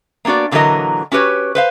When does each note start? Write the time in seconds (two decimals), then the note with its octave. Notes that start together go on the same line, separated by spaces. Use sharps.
0.25 A#3 B3 D4 F#4 D5
0.51 A#2 D3 E3 F#3 A#4 D#5
1.12 C#4 F#4 G4 B4 C#5
1.55 B4 C5 F5